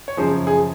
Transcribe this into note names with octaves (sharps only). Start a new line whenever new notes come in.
C#5
F#2 C#3 F3 G#4 C5
G#4